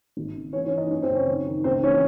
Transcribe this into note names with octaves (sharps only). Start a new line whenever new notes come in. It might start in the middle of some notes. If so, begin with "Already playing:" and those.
G#1
C#3
E3 C#4 C#5
C#4 C#5
E3
D#4 D#5
F#2 C#4 C#5
C4 C5
F#1
C#4 C#5
D#3
D#3
C#2 C4 C5
E3 C#4 C#5